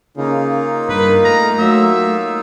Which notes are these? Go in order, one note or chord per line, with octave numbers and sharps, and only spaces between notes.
C#3 A#3 D#4 F4
G2 A#4 B4
A3 A#5
F#3 E5